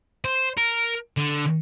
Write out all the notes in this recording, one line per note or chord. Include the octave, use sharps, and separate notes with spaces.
C5
A#4
D3